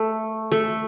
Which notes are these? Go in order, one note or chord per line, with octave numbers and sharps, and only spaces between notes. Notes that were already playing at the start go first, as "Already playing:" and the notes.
Already playing: A3
A3